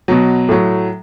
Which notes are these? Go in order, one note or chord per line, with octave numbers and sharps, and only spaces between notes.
B2 F#3
A2 F#3